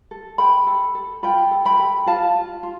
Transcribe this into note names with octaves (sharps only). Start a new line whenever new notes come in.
A4
A4 G5 B5
A4
A4
F4 G5 B5
A4
G5 B5
A4
F4 F5 A5
F4
F4